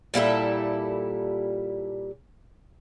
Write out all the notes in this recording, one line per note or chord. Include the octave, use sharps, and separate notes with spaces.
A#2 G3 E4 A4